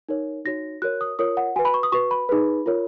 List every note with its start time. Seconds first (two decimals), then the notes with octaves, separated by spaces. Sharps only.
0.09 D#4 A#4 C#5
0.45 D#4 F#4 C#5 A#6
0.82 F#4 A#4 C#5 F#6
1.01 D#6
1.19 F4 A#4 C#5 D#6
1.37 F#5
1.56 F#4 B4 G#5
1.65 B5
1.74 C#6
1.83 D#6
1.92 F#4 B4 C#6
2.11 B5
2.29 D#4 G#4 B4
2.66 F4 A#4 C#5